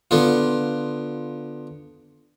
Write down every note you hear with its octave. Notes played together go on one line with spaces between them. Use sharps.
D3 B3 F4